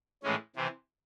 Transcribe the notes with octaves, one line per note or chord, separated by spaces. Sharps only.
A2 E3 G#3 C#4
C3 E3 C4